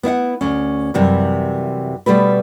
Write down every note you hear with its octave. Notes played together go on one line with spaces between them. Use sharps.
B3 E4 F5 F#5
D2 C#4
F#2 C3 E3 G3
B2 G3 A3 B4